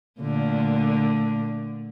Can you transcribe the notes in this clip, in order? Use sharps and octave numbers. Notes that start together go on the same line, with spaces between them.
A#2 D3 A3